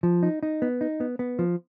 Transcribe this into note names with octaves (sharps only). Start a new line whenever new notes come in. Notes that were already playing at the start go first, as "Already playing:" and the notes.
F3
D#4
D#4
B3
D#4
B3
B3
F3